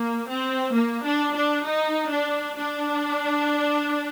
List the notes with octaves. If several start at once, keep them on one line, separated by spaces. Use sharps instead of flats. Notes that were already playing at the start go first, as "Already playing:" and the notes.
Already playing: A#3
C4
A#3
D4
D4
D#4
D4
D4